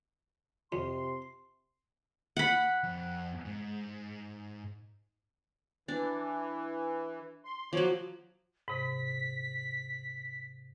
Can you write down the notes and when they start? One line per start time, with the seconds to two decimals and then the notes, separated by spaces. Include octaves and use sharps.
0.72 F2 C3 C6
2.37 F#5 B5
2.84 F2
3.45 G#2
5.88 E3 D4
7.45 C6
7.73 F3 F#3 C#5 D6
8.68 G#2 C3 B6